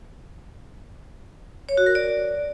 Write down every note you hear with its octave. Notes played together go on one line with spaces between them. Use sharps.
C#5
F#4
A#4
D5